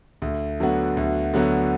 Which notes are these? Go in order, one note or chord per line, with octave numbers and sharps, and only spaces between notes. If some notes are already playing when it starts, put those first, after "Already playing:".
D2
D3 F#3 B3 F#4
D2
D3 F#3 B3 F#4